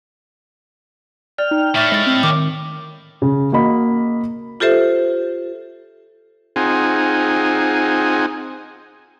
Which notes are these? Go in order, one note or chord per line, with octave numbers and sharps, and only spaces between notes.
D5 G5 F6
D#4
A2 D5 E5 C#6 A6
G#3 D#5 A6
C4
D#3 D6
C#3
A#3 F#4 D#5 B5
F4 G4 A4 C5 E5
C4 D#4 F4 G#4 F#5 G#5